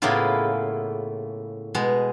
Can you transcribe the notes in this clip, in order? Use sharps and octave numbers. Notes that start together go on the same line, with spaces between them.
A2 C#3 A#3 B3 E4 F4
B2 G#3